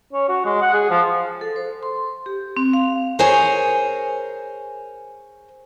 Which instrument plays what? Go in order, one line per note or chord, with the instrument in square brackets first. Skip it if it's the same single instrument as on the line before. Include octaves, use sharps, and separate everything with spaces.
[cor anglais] C#4
F#4
G#3
F#5
G#4
F3
[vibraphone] A4
C5
C6
G4
C4
F5
[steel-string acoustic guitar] G#4 A#4 C5 C#5 G#5 A#5